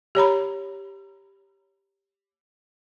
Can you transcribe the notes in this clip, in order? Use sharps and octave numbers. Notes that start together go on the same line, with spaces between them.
G4 C#5 A#5 B5